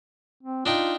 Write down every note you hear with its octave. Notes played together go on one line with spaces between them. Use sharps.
C4
D4 D#4 F4 G5